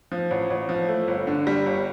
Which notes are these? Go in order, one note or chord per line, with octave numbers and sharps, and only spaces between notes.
F3
A1
A1
F3
A3
G1
D3
G3
G1